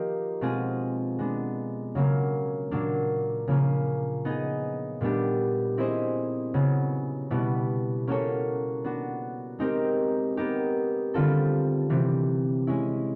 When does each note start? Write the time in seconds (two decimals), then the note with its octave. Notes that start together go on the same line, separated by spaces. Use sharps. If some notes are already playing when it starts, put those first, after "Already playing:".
Already playing: F3 A#3 D#4 G4
0.41 B2 G#3 C4 F4 G#4
1.19 G#3 B3 D4
1.95 C#3 F#3 A#3
2.71 A#2 F#3 A#3 D4
3.48 C#3 F3 A#3 C#4
4.25 B3 D#4 G#4
5.01 A#2 G3 B3 D4 G4
5.78 C4 E4 G#4 C5 D#5
6.54 C#3 F#3 B3
7.31 B2 G3 B3 E4
8.07 A#3 C#4 F#4 A4 C#5
8.84 B3 D4 F#4
9.59 G#3 C4 D#4 G4 A#4
10.37 B3 D#4 G4 A#4
11.14 D3 G3 C4 F4 A4
11.90 C3 E3 G3 C4
12.67 G#3 C#4 E4